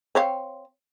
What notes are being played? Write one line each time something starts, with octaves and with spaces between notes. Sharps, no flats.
C4 C#5 F5